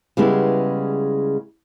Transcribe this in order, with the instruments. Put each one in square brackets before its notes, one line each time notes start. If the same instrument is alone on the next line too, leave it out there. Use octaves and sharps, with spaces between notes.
[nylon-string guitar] C#3 G3 G#3 B3 E4